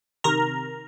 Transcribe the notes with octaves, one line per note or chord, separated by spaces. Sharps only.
C3 D#3 A#4 A#5